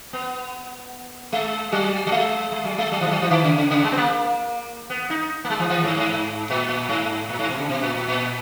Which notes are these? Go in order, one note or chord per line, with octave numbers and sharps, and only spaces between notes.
B3
G#3
F#3
F#3
G#3
G#3
F#3
G#3
F#3
E3
G#3
F#3
E3
D#3
C#3
C#3
C#3
G#3
B3
A#3
B3
D#4
A#3
G#3
E3
E3
G#2
G#2
A#2
A#2
G#2
A#2
G#2
B2
C#3
B2
A#2
A#2
A#2